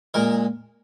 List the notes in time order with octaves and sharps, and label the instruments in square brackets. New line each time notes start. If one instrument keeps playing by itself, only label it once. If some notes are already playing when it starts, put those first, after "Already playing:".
[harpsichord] A#2 G#3 A#4